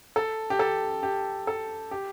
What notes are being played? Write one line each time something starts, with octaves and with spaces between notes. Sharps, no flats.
A4
G4
A4
G4
A4
G4